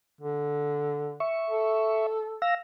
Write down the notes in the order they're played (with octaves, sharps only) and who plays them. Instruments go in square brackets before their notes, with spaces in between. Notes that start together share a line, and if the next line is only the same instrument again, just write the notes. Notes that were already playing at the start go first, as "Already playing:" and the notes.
[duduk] D3
[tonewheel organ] E5 C#6
[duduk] A4
[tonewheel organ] F5 E6 A#6